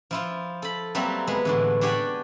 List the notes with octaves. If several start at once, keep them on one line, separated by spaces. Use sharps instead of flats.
F3 E4 F4
A4 B5
F#3 G3 A#3 C4 A4 E5
G#3 B3
A2 D3 E3
D4 G4 C#5 D5 F#5 G#5